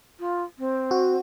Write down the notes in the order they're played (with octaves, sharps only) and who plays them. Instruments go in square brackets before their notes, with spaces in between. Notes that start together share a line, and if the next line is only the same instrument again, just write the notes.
[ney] F4
C4
[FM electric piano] F#4